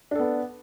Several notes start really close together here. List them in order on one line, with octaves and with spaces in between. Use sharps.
D4 A4 B3